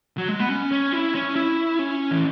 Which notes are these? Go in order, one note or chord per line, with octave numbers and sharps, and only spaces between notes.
F#3
G#3
B3
C#4
C#4
E4
C#4
E4
C#4
E3